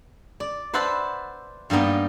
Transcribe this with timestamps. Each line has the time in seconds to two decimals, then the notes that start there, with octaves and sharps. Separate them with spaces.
0.40 D5
0.74 B4 C5 E5 F#5 A5 B5
1.70 G2 G3 A#3 B3 D#4